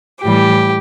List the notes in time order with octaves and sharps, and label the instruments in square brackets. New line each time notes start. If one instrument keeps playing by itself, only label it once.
[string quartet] A2 E3 G3 G4